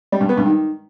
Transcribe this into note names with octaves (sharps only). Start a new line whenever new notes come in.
G3
G2
B3
G2
D#3